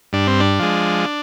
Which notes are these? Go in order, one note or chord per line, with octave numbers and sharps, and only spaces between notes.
G2 D4
C4
D4
F3 G#3